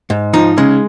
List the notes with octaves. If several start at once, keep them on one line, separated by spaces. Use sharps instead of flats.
G#2
F3 D#4
C#3 G#3